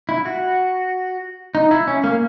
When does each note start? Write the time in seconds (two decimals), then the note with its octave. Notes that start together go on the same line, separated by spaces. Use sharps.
0.09 E4
0.26 F#4
1.55 D#4
1.71 E4
1.88 C#4
2.04 A#3